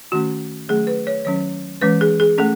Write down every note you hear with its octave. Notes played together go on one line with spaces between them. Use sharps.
D#3 A3 C#4 F#4
D#3 F#3 A3 C#4 G#4
B4
C#5
D#3 F#3 C#4 C#5
E3 G#3 C#4 B4
G#4
G#4
A3 C#4 A4